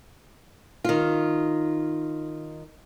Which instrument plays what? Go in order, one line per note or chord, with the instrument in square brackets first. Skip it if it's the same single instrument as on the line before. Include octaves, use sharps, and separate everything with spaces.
[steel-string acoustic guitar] D#3 F4